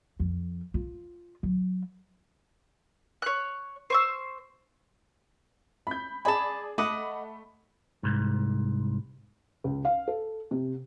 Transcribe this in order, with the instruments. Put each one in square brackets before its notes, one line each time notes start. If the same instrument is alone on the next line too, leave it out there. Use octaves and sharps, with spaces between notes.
[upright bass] F2
F4
F#3
[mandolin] C#5 F#6
C5 C#6 E6
[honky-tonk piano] B5 G6
[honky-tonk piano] G#4 D5 G#5 [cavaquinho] A5 B5
[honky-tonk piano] A3 B5 [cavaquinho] D#5 F#5 D6
[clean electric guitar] C2 G#2
[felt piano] C#2
F5
A4
C3